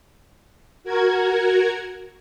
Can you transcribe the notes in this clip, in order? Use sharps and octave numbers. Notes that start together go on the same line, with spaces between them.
F#4 A#4 G#6